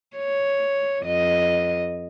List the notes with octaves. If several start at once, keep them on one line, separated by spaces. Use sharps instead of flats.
C#5
F2 D#5